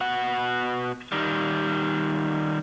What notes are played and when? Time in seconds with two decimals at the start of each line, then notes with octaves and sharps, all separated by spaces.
0.01 B2 F#5
1.12 D#3 G3